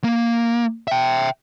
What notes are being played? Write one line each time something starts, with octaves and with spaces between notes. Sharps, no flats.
A#3
E5 G5